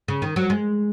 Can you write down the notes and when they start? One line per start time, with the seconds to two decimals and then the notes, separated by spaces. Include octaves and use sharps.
0.08 C#3
0.22 D#3
0.36 F#3
0.50 G#3